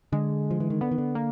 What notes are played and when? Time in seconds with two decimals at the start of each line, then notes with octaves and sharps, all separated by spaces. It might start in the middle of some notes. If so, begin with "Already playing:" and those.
0.13 D3 G#3
0.51 F3
0.60 E3
0.70 D#3
0.81 D3 B3
0.91 D#3
0.98 D3
1.15 A#3